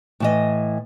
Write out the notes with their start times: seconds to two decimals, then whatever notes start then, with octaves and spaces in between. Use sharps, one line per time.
0.20 A2 E3 D#5